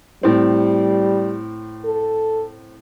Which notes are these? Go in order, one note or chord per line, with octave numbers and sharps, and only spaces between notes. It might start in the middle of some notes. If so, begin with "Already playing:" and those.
A2 G3 C4
A4